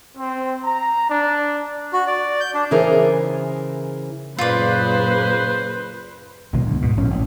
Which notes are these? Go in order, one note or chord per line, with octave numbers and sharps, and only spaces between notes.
C4
A#5
D4
F#4
D5
G6
D4
C#3 E3 G#4 A#4 C5 A#5
F#2 A#2 C#3 F4 B4 C5 D5
B1 B2 D#3 G#3
D2 G2
G#2 B2
A#1 C#4
A1